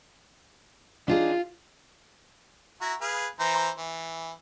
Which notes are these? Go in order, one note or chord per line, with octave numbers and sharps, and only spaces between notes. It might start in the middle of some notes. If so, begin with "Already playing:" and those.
D4 D#4 F4 G#4
E4 F#4 A#5
G#4 B4 F5
E3 C5 A#5
E3